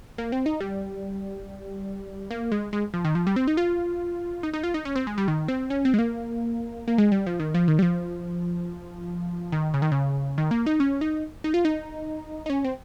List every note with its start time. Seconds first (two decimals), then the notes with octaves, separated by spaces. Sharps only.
0.18 A#3
0.32 C4
0.46 D#4
0.61 G3
2.31 A#3
2.52 G#3
2.73 G#3
2.94 F3
3.05 D#3
3.15 F3
3.27 G3
3.36 C4
3.48 D#4
3.57 F4
4.43 D#4
4.53 D#4
4.64 F4
4.74 D#4
4.85 C#4
4.96 C4
5.07 G#3
5.18 G3
5.28 D#3
5.48 C4
5.70 C#4
5.85 C4
5.94 G#3
5.99 A#3
6.88 A#3
6.98 G#3
7.12 G3
7.27 F3
7.40 D#3
7.54 F3
7.68 D#3
7.79 G3
7.82 F3
9.52 D#3
9.74 C#3
9.82 D#3
9.92 C#3
10.38 D#3
10.51 A#3
10.66 D#4
10.80 C#4
11.01 D#4
11.44 D#4
11.54 F4
11.65 D#4
12.46 D#4
12.50 C#4
12.64 C4